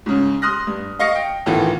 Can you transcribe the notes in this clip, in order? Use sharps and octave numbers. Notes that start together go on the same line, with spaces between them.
G#2 C#3
C6 D#6 F6 F#6 A#6
G2
D#5 F5 C#6 A#6 C#7
G5
D2 A2 D#3 E3 B3 F4